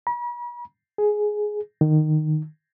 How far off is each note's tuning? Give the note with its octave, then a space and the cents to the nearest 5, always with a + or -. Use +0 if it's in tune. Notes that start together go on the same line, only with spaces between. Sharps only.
B5 -45
G#4 +10
D#3 -15